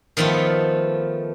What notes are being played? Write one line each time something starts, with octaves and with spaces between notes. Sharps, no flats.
D#3 F3 A3 B3 F4